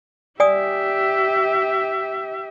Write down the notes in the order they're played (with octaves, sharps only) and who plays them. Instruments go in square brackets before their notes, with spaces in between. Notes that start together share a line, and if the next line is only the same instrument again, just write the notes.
[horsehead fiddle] G4 E5 [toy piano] D5 G#5 D#6